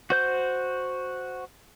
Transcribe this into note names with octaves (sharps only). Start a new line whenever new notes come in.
F#4 C5 G6